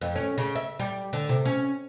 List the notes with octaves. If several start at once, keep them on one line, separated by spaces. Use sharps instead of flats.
F2
C#4
C#3
E5
G3
D3
C3
C#4